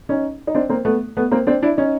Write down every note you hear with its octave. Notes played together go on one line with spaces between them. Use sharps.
C#4 D#4
D#4
C4 D4
A#3 C4
A3 B3
A3 B3
A#3 C4
C4 D4
D4 E4
C#4 D#4